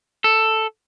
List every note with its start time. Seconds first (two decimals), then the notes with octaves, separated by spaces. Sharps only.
0.24 A4